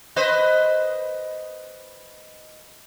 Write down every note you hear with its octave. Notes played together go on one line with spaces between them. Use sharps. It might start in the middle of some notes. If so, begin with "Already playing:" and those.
B4 C5 D#5